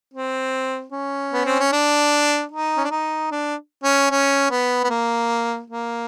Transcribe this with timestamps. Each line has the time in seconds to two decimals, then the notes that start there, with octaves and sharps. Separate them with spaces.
0.13 C4
0.92 C#4
1.33 B3
1.46 C4
1.59 C#4
1.72 D4
2.51 D#4
2.77 C#4
2.84 D4
2.91 D#4
3.31 D4
3.83 C#4
4.11 C#4
4.50 B3
4.84 B3
4.90 A#3
5.70 A#3